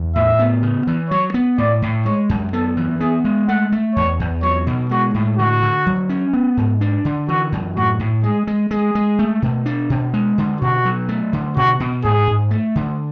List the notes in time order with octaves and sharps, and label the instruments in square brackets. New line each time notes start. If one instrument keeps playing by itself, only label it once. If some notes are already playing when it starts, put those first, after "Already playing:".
Already playing: [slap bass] E2
[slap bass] A2 [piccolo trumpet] E5
[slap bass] B3
C#3
E3
[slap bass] F#3 [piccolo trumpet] C#5
[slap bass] B3
[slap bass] A2 [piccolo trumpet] D5
[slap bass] A2
[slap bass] G#3 [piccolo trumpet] C#5
[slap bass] F#2
[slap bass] B3 [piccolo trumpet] A4
[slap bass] E3
[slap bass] B3 [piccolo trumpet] G#4
[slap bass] G#3
[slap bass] A3 [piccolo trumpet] F#5
[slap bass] A3
[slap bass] E2 [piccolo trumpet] C#5
[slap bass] E2
[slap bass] F#3 [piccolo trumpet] C#5
[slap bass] B2
[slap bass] G#3 [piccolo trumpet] F#4
[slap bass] A2
[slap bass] D3 [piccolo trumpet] F#4
[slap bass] D3
F#3
C#4
B3
G#2
D4
D3
[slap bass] E3 [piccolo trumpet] F#4
[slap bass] F#2
[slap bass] A2 [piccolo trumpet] F#4
[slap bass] A2
[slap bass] G#3 [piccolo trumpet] G#4
[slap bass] G#3
[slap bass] G#3 [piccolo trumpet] G#4
[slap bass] G#3
A3
B2
D4
B2
G#3
D3
[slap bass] B2 [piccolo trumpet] F#4
[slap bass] F#3
A3
D3
[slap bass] B2 [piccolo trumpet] F#4
[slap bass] B2
[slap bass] G#2 [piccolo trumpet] G#4
[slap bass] G#2
A3
D3